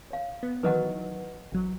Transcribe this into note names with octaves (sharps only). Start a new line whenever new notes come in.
C#5 F5
B3
D#3 E3 F#3 B4 D#5 F#5
A1 F#3